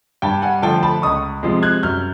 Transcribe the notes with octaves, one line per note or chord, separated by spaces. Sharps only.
G2 G5 A5
F#5 G#5
D3 F3 A3 G5 A5
A5 B5
C#2 C#6 D#6
C3 F3 G#3
F#6 G#6
F#2 F6 G6